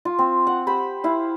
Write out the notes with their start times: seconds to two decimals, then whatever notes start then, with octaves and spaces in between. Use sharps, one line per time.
0.05 F4
0.19 C4
0.47 F#5
0.67 G4 C5 B5
1.04 E4 F5